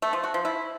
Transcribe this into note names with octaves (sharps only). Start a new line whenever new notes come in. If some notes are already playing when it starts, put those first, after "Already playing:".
A3
F3
F#4
F3
E4